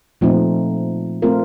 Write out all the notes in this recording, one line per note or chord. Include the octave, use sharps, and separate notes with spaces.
A#2 F3 A3 C4 D#4
A3 C4 F4 A#4